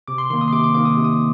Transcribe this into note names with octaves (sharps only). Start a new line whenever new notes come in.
C3 D6
C6
D#3 A#3 C6
D#6
C6
C3 D6
D6
D#3 A#3 D6
D#6
C3
D#6